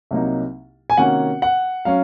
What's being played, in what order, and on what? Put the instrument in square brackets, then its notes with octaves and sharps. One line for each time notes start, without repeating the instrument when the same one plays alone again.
[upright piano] C2 C3 F#3 A#3 D#4
[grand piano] G#5
[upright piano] C3 D#3 A#3 C#4 F#4 [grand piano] F#5
[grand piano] F#5
[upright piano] F#3 C#4 [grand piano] F5